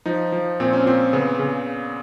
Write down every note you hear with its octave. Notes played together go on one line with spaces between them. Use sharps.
F3 D#4
F3
A#2 C4
C#4
A#2 C4
C#3 B3
C#3